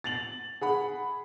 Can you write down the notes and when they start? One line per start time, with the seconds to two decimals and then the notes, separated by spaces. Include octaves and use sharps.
0.04 A6 F7 F#7
0.61 G#4 F#5 B5